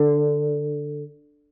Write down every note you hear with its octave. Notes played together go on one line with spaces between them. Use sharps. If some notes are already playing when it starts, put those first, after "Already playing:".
Already playing: D3